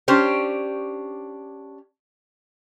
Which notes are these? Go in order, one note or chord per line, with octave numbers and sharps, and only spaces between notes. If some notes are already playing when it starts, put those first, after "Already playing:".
C#4 D4 G4 C5